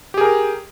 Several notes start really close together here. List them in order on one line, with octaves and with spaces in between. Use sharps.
G4 G#4 A#4